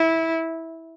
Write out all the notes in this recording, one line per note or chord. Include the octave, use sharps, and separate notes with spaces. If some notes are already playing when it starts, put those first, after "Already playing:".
Already playing: E4